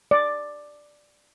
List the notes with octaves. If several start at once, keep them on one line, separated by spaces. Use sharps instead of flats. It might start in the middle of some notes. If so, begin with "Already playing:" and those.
D5